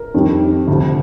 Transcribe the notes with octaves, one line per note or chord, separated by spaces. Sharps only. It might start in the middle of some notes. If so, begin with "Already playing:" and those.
Already playing: A#4
F2 D#3 G3
D2 C3 F3